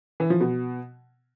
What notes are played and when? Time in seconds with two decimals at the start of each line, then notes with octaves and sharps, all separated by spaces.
0.20 E3
0.30 F3
0.40 B2